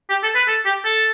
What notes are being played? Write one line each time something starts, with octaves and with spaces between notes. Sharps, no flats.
G4
A4
B4
A4
G4
A4